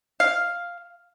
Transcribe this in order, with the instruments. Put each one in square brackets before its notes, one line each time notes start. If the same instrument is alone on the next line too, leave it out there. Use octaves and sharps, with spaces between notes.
[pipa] F5